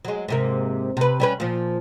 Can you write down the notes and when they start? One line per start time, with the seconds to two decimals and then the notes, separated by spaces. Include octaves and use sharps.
0.05 F#3 G#3
0.28 G#2 C3 A#3
0.97 C3 B4
1.20 G3 C#4 B4
1.40 A#2 F3